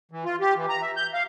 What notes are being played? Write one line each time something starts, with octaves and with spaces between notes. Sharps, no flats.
E3
F4
G4
E3
A#5
E5
G6
F5